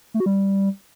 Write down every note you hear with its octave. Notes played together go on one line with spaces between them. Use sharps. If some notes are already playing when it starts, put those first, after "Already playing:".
A3
F#4
G3